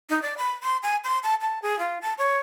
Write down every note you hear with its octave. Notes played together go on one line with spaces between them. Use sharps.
D#4
D5
B5
C6
G#5
C6
A5
A5
G#4
F4
A5
C#5